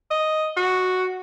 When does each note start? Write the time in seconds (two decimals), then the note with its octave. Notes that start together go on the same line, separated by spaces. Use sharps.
0.11 D#5
0.57 F#4